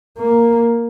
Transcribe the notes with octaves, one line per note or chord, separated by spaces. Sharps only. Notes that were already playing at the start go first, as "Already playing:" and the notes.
A#3